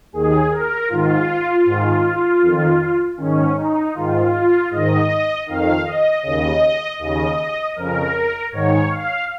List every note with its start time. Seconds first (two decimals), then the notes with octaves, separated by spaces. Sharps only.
0.12 D#2 D#3 G#4
0.51 A#4
0.89 G#2 D#3 F4
1.65 G#2 D#3
2.42 F2 D#3
3.18 G#2 D#3 C#4
3.57 D#4
3.94 G#2 D#3 F4
4.32 F4
4.71 G#2 D#3 D#5
5.46 F2 D#3 F5
5.85 D#5
6.23 D#2 C#3 D#5
6.99 D#2 C#3 D#5
7.76 F2 C#3 A#4
8.52 G#2 D#3 C#5
8.90 F5